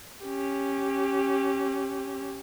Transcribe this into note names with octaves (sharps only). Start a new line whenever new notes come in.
C#4 G4